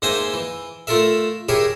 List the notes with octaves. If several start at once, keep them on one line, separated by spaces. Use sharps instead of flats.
G#2 A#3 D#4 C5 E5 G#5
E3
A3 F4 A4 A#4 E5
E4 G4 G#4 A#4 C#5 E5